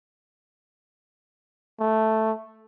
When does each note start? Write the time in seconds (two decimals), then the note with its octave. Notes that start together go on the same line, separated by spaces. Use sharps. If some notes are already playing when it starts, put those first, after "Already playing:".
1.80 A3